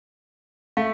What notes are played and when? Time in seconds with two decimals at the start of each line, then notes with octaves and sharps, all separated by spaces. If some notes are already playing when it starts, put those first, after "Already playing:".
0.77 A3 F5